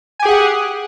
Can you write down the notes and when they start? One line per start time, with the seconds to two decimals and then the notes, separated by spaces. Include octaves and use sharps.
0.19 G#5
0.22 G4
0.25 G#4
0.28 F#5